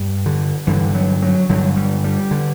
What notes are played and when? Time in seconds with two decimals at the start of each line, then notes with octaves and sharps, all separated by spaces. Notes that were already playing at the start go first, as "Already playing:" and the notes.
Already playing: G2
0.26 D3
0.67 G2 D3 E3
0.94 F#3
1.22 F#3
1.49 G2 D3 F#3
1.76 G3
2.04 G3
2.31 D3